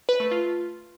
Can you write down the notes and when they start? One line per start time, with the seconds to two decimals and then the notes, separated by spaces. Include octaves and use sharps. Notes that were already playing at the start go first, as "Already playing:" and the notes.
0.09 B4
0.20 A3
0.31 F4